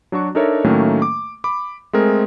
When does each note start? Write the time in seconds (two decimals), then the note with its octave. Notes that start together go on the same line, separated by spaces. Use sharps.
0.12 F#3 D4 F#4 C#6
0.35 D4 D#4 A4 A#4 C#5 E5
0.64 A2 D#3 F#3 A3 A#3 C#4
1.02 D6
1.44 B5 D6
1.93 G#3 A3 C4 G#4 A#4